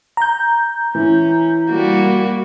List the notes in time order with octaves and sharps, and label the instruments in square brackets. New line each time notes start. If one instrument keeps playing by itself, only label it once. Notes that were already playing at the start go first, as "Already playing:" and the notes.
[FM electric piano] A#5 G6
[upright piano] E3 [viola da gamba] C#4
[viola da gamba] G3 A#3 F#4